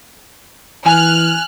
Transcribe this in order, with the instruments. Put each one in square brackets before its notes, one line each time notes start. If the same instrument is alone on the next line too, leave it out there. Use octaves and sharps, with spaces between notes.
[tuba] E3 [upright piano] G#5 [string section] F6 F#6